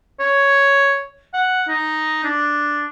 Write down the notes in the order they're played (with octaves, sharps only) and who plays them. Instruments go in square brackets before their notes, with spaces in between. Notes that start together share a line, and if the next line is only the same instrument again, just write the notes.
[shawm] C#5
F#5
D#4
D4